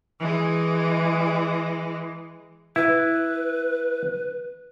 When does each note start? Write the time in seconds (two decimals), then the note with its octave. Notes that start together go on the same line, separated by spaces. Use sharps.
0.20 E3 G#3
2.76 E4 B4